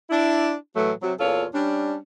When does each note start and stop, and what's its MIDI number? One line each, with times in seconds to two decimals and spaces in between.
0.10 0.54 62
0.10 0.54 64
0.75 0.92 45
0.75 0.92 52
0.75 0.92 54
0.75 0.92 57
1.03 1.13 48
1.03 1.13 54
1.19 1.46 40
1.19 1.46 46
1.19 1.46 65
1.19 1.46 69
1.19 1.46 73
1.54 1.97 55
1.54 1.97 61
1.54 1.97 62